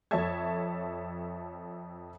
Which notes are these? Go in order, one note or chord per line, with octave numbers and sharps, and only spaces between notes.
F2 A4 C#5 E5 A5 G#6